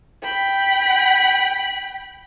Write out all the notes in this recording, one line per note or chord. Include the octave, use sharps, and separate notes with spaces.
G5 B5